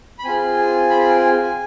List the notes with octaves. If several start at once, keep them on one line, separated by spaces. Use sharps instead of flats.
B5
C4 F4 G#4 G#5
G#5
B5
G#5
G5
G#5